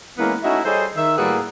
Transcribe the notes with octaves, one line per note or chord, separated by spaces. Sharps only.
E3 G#3 A#3 B3 C#4 E4
A3 C#4 D#4 E4 F#4 E5
G3 G#4 A4 C5 C#5 D#5
D#3 E5
A2 G3 A#3 F#4 G#4 B4